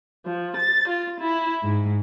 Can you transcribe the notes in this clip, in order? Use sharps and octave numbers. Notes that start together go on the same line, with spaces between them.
F3
A6
F4
E4
G#2